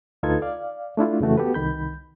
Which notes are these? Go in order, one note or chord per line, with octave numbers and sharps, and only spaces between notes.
D2 D#4 F4 A4 B4 G#6
D5 F5
A3 D4 E4 F4
F2 C#3 E3 A3 F#4
B3 F#4 G4 A4 B4
C2 D#3 B5 G6